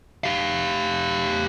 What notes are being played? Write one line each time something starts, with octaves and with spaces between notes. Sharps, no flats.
G4 F5